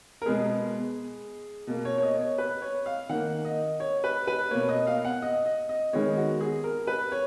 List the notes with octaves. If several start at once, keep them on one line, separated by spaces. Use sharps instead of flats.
A#4
B2 G#3 B3 G#4
B2 A#3
C#5
C#5
D#5
C#5
B4
C#5
F5
D#3 A#3 F#5
D#5
C#5
B4
B4
B2 A#3 C#5
D#5
F5
F#5
D#5
D#5
D#5
D#3 G#3 B3 C#5
F#4
G#4
A#4
B4
C#5